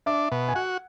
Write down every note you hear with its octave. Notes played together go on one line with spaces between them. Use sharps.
D4 E5
B2
G#5
F#4 F#5